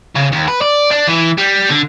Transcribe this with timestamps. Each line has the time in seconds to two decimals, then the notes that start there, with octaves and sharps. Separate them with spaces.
0.16 C#3
0.32 D#2
0.48 B4
0.61 D5
0.91 D4
1.07 E3
1.38 G3
1.70 D3